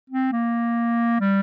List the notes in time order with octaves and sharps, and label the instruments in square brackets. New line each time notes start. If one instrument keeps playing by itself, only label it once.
[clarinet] C4
A#3
G3